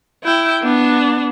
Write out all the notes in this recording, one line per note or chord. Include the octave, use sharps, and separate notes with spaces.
E4 G5
B3 D4